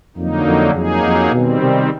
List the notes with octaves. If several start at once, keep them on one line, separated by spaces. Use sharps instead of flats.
F2 D3 F#3 A#3 D#4
F2
F2 F#3 A#3 D#4 G#4
F2
B2 D#3 G3 C4
C3